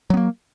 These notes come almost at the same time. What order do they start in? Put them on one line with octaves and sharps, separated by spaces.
F#3 B3 A#3